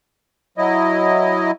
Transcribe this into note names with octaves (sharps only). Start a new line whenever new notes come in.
F#3 E4 D#5